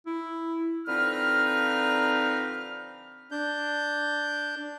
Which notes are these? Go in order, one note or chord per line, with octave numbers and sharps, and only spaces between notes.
E4
D3 F3 C4 D#4 B4 F6
D4 G6